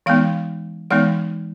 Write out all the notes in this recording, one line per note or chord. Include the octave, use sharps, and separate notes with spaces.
E3 G#3 B3 D#4 F5
E3 G#3 B3 D#4 F#5